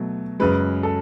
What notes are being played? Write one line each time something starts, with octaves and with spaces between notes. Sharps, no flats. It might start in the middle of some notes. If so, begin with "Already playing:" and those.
Already playing: B2 F#3 A3
F#2 C#3 G#3 B4
A4